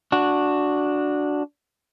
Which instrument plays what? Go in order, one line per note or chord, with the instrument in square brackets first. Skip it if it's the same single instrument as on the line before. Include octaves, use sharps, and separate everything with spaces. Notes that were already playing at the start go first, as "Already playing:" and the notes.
[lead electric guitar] D4 F#4